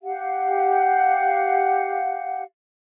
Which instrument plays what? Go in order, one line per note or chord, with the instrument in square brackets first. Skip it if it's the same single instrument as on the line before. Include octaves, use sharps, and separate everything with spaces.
[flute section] G4 F5 F#5